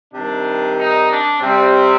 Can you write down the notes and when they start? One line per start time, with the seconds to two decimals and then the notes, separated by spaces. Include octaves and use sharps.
0.14 C3 D#3 G3 D4
0.78 D#4
1.09 D4
1.41 C3 G3 C4